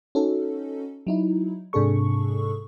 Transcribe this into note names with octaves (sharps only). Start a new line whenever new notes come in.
C#4 D#4 F#4 A4
F#3 D#4 E4
G#2 C3 D4 G#4 A4 C#6